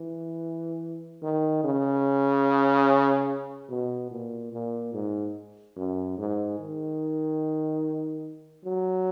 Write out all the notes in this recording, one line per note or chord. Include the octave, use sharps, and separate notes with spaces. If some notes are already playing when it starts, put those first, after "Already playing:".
Already playing: E3
D#3
C#3
B2
A#2
A#2
G#2
F#2
G#2
D#3
F#3